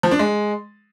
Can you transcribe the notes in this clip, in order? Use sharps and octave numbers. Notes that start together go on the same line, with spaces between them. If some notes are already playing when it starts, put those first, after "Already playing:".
F3
D4
G#3